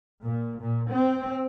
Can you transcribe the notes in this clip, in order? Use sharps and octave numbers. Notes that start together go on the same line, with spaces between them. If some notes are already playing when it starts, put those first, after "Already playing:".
A#2
A#2
C4